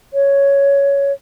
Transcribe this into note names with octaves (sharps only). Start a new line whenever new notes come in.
C#5